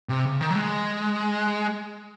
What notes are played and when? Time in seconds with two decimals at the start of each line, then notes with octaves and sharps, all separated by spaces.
0.09 C3
0.25 C#3
0.41 D#3
0.50 F#3
0.56 G#3